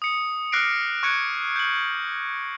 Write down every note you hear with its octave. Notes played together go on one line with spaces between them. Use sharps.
D#6 C#7
D6 F6 F#6 A#6 C7 D7
C#6 F#6 G#6 C#7 D7
G6 F#7